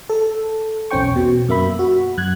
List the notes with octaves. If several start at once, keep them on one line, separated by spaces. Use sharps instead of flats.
A4
B1 E2 C#4 C5 G5 C#6
B2
F#2 A#3 E5 B5
F#4
F#2 F#6 G#6